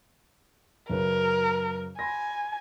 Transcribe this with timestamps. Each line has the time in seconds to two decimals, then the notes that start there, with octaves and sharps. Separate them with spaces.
0.90 F#2 C#3 A#4 B4
1.99 G#5 B5 C6 A#6